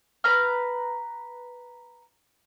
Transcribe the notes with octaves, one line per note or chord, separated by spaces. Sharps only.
B4 A#5 F6